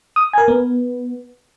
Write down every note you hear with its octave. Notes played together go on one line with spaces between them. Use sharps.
D#6
A#4 G#5
B3